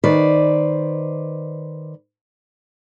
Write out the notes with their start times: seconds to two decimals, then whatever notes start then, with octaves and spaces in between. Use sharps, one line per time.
0.04 D#3 B4 C5 D5